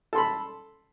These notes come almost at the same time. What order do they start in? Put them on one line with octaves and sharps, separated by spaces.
A4 C6 B5